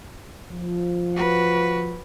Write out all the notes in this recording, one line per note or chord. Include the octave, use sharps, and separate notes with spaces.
F3
F#4 B4